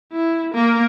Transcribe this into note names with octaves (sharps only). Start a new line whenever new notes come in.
E4
A#3 A#4